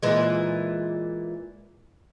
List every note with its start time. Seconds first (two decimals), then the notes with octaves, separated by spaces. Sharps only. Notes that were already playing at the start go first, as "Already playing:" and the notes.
0.03 A#2 E3 G#3